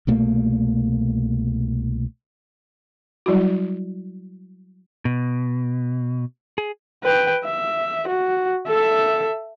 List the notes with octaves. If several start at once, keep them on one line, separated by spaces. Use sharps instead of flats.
C2 B2 A3 A#3
F#3 G3 E4 F#4
B2
G#4
B4 G5
E5
F#4
A4 E5